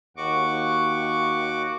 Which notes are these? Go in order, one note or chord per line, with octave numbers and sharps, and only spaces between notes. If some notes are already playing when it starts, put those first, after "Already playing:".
D#2 F#4 C#6 D6